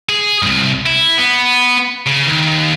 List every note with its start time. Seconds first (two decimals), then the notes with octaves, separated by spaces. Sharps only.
0.09 G#4
0.43 C2 G2
0.86 E4
1.18 B3
2.06 C#3
2.26 D#2